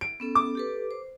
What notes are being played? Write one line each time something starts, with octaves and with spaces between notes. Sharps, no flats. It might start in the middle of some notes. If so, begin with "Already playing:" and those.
D7
B3 C#4 A4
D6
G4 A4 B4
C5